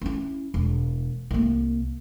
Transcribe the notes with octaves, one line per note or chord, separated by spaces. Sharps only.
C#4 E4
E1
C2 A#3